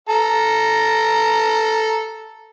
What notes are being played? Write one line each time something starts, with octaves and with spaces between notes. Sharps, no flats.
A4 A#5